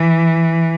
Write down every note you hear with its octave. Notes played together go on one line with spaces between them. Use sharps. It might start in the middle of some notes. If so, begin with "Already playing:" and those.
Already playing: E3